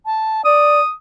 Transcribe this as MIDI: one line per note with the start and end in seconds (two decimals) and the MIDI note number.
0.06 0.44 81
0.45 0.80 74
0.45 0.92 87